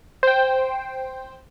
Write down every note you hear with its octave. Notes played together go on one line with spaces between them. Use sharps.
C5 G5